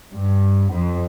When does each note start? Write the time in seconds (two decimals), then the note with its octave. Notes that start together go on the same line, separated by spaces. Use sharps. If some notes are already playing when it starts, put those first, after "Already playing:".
0.12 G2
0.70 F2